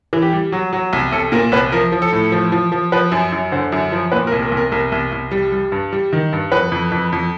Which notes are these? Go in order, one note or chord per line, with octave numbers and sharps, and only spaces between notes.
E3
G4
G3
F#3
F#3
C2
C2 A4
A#2 A#4
C2 B4
F3 A#4
F3
A4
A2
F3
F3
F3
F3 B4
F#2
F#2
D3 C5
F#2
F3
A#2 B4
A#4
C2
A#4
C2
A#4
C2 A#4
C2
C2
G3
G3
G2
G3
D#3
G2
F2 B4
F2
F2
F2